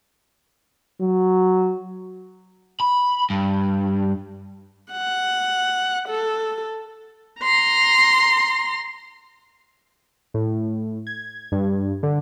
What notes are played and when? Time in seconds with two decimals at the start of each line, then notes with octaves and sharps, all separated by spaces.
1.01 F#3
2.81 B5
3.30 G2
4.92 F#5
6.09 A4
7.41 A#5 C6
10.34 A2
11.07 G#6
11.52 G2
12.03 D3